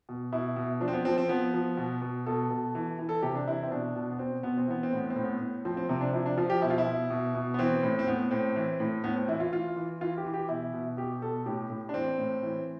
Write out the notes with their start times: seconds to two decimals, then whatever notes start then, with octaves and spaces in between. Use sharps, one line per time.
0.09 B2
0.32 B2 E4
0.56 B2
0.80 F3 D4
0.88 C4
0.93 B3
1.05 F3 C4
1.18 C4
1.29 F3 B3
1.54 F3
1.77 B2
2.02 B2
2.26 B2 A4
2.50 B2
2.75 E3
2.99 E3
3.09 A4
3.22 C3 G4
3.35 D4
3.46 E3 E4
3.62 C4
3.71 B2 D4
3.96 B2
4.11 B3
4.19 B2 C4
4.43 B2 B3
4.58 C4
4.68 E3 B3
4.83 C4
4.92 A2 B3
5.10 C4
5.16 A2
5.23 B3
5.40 A2
5.65 F3 C4
5.77 C4
5.89 C3 C4
6.01 D4
6.13 F3 E4
6.26 D4
6.38 F3 F4
6.50 G4
6.62 B2 E4
6.70 F4
6.78 E4
6.87 B2
7.10 B2
7.35 B2
7.54 B3
7.59 E3 C4
7.83 A2
7.99 C4
8.06 A2 B3
8.31 A2 C4
8.56 E3
8.80 A2
9.04 A2 B3
9.16 C4
9.28 E3 E4
9.40 F4
9.52 E3 F4
9.76 E3
10.01 E3 F4
10.18 G4
10.25 E3
10.34 G4
10.49 B2 E4
10.74 B2
10.97 B2 G4
11.21 B2 A4
11.46 A2 G4
11.70 A2
11.89 D4
11.94 E3 C4
12.19 A2
12.43 E3